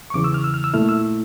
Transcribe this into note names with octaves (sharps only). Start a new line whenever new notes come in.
C#6
E2 C#3 E3 D6
E6
F6
E6
F6
E6
A#2 A3 E4 F6
E6